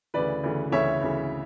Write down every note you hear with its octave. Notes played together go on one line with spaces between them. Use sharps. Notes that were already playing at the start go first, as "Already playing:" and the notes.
D2 C#3 E3 B4 D5
D2 C#3 E3
D2 C#3 E3 C#5 E5
D2 C#3 E3